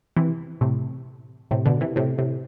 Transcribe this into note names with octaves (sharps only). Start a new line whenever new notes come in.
C3 E3
A2 C3
A2 C3
B2 D3
C3 E3
A2 C3
A2 C3